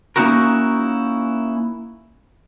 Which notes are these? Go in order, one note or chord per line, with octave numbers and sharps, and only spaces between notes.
A#3 C#4 D#4 E4 F#4 A#4